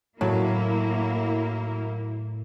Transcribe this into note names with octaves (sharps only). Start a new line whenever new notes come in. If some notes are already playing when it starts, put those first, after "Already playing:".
A2 F#3 A#3 E4